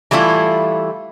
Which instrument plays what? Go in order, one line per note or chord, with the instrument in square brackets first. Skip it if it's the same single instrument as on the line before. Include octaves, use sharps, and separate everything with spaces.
[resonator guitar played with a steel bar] E3 G3 A3 E4 F4